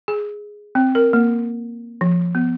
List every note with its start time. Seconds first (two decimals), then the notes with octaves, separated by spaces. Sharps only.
0.08 G#4
0.75 C4
0.95 A#4
1.13 A#3
2.01 F3
2.35 B3